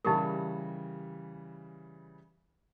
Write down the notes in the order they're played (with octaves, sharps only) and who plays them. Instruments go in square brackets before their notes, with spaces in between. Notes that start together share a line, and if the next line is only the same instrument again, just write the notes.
[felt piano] C#3 E3 G3 [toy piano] D#4 G4 A#4